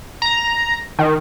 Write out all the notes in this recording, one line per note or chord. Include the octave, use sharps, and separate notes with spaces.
A#5
D#3